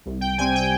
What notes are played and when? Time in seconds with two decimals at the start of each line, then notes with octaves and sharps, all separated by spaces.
0.06 C2
0.21 G5
0.38 C3 G3 C4 G#5
0.55 G5